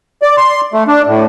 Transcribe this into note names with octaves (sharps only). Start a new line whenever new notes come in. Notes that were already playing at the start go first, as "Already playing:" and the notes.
D5
C6
A3
D4
A2